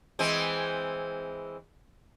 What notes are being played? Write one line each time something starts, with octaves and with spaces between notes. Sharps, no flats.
E3 G#3 C4